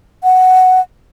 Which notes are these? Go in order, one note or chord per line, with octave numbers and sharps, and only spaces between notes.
F#5